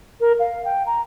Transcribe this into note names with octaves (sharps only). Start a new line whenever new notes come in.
A#4
F5
G5
A#5